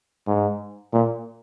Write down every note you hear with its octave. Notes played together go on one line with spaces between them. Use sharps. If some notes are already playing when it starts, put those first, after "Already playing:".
G#2
A#2